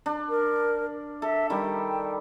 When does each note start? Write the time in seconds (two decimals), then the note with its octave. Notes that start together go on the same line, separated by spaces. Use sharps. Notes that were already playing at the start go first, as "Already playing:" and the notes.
0.06 D4
0.29 A#4
1.22 A4 E5
1.50 D#3 G3 G5